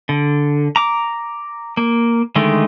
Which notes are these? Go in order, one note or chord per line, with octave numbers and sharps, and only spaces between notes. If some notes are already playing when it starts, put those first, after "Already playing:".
D3
A#5 D6
A#3
D3 D#3 G#3 A3